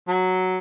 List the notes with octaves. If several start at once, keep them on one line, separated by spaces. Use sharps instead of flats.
F#3